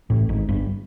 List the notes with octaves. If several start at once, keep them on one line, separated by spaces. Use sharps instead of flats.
A1 A2
G#1 G#2
G1 G2